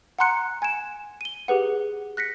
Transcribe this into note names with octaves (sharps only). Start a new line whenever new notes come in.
F#5 G#5 A#5 C6 F#6 C#7
G#5 G#6 D7 E7
D#7 G7
G4 G#4 B4 F#5
F#6 A#6 B6 C#7